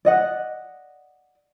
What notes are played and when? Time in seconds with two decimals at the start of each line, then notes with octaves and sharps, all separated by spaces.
0.05 D5 D#5 F#5